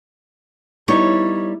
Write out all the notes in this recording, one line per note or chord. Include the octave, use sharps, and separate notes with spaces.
G3 B3 D#4 E4 C#5